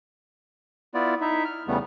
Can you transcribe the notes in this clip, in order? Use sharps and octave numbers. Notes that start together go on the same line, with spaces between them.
B3 E4 F4 D5
D#4 E4 E5
F6
E2 C#3 G3 A3 B3